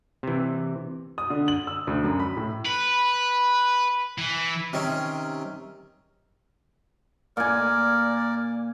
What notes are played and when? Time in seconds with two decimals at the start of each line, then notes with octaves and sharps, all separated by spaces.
0.23 C3 E3
1.18 D#6
1.30 D3
1.48 F#7
1.67 E6
1.87 D2
2.04 F#2
2.20 B5
2.37 A2
2.66 B4
4.18 E3
4.73 C3 D#3 C#4
7.37 A#2 A#4 D5 G#5